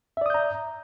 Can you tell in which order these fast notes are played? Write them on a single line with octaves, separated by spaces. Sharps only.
E5 D5 D#6 G6 A#5